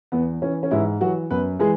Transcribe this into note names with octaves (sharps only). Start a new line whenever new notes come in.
E2 B3
E3 C#4
C#4
G#2 E3 E4
E3 F#3 F#4
F#2 B3 B4
E3 G#3 G#4